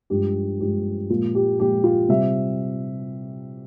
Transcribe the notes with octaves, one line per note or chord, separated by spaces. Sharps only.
G2 F3 G#3 G4
G2 F3 G#3 G4
A#2 F3 G#3 F4
G4
A#2 F3 G#3 G4
F4
C3 G3 C4 E5